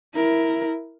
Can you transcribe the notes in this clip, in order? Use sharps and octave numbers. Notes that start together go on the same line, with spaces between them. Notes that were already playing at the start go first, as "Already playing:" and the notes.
E4 A#4